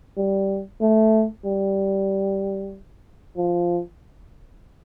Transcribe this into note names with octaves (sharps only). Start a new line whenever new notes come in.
G3
A3
G3
F3